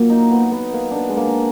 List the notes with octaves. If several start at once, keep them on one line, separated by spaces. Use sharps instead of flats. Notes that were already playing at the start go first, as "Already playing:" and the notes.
Already playing: A#2 F#3 A#3
D#4
B3
B3
A#3
B3 D4
G#3
A#3